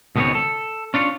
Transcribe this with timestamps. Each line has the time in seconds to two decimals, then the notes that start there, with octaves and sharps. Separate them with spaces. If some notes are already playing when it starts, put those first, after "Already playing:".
0.16 C#2 B2 D#3 B3 C4 C#5
0.35 A4
0.94 C#4 D4 F4 C#5